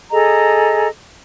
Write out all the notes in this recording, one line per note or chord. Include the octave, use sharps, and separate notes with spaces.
G#4 A4 D#5 A#5